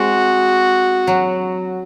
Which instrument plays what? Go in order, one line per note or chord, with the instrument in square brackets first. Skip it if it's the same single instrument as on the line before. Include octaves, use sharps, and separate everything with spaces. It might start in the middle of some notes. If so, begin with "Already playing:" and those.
Already playing: [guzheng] G#3 C4 [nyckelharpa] F#4
[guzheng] F#3